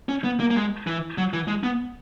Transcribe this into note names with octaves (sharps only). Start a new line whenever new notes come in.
C#4
B3
A#3
A#3
G#3
E3
F#3
E3
G#3
B3